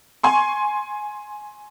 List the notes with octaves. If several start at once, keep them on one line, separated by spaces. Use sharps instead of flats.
G#5 C6 C#6